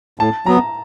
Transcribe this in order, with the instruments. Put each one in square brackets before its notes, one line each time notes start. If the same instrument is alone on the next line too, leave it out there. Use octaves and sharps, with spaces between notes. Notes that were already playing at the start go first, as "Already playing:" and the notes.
[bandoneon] A2 [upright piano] A5
[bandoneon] F#3 B3 [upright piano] A#5